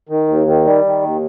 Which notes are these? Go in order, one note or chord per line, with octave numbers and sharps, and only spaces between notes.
D#3
D#2
D#3
G3
D#3
D#2